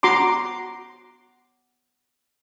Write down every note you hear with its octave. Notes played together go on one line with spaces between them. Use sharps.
F#4 A#5 C6 D6